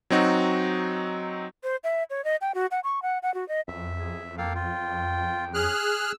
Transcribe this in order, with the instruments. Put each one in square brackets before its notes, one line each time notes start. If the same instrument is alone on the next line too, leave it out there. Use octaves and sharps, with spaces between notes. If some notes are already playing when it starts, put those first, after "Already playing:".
[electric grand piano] F#3 C4 D#4 F#4
[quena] C5
E5
C#5
D#5
G5
F#4
F#5
C#6
F#5
F#5
F#4
D#5
[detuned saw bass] F2 [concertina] E5
[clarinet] G#4
[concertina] A#3 A4 F5 [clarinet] G5
[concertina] F4 [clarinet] G5
[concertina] C#4 [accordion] G#4 F6 F#6
[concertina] E6